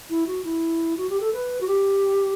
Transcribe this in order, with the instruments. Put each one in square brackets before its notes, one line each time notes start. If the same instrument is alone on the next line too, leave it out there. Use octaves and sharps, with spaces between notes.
[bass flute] E4
F#4
E4
F#4
G4
A4
B4
F#4
G4